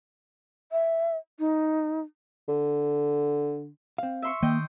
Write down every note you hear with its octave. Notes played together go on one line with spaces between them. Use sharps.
E5
D#4
D3
C4 F5
E5 C6 C#6
D#3 A#3 D#5 G5